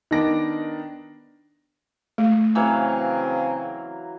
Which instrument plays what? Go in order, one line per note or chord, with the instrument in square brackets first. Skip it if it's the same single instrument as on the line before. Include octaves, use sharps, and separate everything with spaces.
[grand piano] D#3 B3 D4 A#6 D7
[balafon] A3
[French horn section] C#3 C4 [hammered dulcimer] E3 F#3 F5